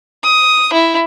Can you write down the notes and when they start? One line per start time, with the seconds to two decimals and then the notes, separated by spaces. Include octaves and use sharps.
0.23 D#6
0.73 E4